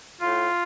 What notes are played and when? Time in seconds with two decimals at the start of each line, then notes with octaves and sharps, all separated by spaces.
0.21 A2 F4